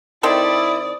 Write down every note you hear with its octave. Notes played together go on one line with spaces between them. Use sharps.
D#3 C4 E4 A4 D5 D#6